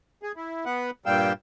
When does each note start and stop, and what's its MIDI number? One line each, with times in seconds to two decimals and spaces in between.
0.23 0.32 68
0.36 0.65 64
0.65 0.91 59
0.65 0.91 71
0.65 0.91 78
1.06 1.33 43
1.06 1.33 46
1.06 1.33 55
1.06 1.33 77
1.06 1.33 79
1.06 1.33 88